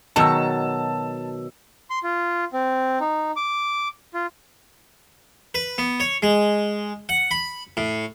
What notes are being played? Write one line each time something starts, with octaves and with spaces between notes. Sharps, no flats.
B2 D#3 F#3 A5 E6
C6
F4
C4
D#4
D6
F4
B4
B3
C#5
G#3
F#5
B5
A2